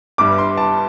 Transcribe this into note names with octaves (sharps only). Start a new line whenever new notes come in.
G1 G2 G3 D6
C6
A5